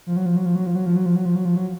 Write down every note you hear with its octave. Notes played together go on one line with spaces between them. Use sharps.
F3
F#3
F3
F#3
F3
F#3
F3
F#3
F3
F#3
F3
F#3
F3
F#3
F3
F#3